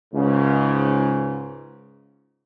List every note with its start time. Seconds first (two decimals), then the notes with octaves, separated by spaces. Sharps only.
0.14 C#2 G#2 C#3